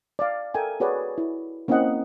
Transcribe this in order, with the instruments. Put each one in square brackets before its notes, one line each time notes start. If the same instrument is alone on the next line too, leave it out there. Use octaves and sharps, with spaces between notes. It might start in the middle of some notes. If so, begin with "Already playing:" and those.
[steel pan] D5 F5
A4 A#4 E5 G5 G#5
F#4 G#4 B4 C#5 D5
E4
A#3 C4 C#4 E4 D#5 F#5